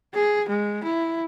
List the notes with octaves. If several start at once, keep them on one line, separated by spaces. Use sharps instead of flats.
G#4
G#3
E4